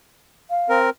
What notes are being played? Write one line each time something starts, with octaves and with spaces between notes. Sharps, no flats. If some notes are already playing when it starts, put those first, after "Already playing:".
F5
C4 A#4